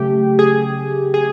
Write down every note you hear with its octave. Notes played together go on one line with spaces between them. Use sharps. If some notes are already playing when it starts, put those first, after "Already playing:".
Already playing: C#3 F#3 A3 G4
G#4
G#4